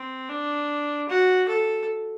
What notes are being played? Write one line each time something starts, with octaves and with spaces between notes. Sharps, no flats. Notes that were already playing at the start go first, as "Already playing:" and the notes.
Already playing: C4
D4
F#4
A4